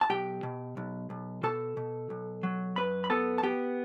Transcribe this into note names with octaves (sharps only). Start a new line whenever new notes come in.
A5
B1 G4 G5
B2
B1
B1
B2 A4 A5
B2
B1
F#3
F#2 B4 B5
B5
B3 A4 A5
A5
B3 G4 G5